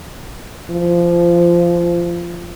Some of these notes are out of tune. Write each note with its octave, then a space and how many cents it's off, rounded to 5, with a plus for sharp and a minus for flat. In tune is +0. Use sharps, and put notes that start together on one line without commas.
F3 -20